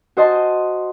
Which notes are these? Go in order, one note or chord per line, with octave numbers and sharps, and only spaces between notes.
F#4 C5 D#5 A5 C6